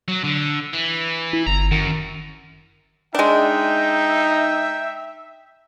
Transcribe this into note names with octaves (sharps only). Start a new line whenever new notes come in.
F#3
D3
E3
E4
G1 A#5
F#2 D#3
G#3 D4 D#4 E5 G5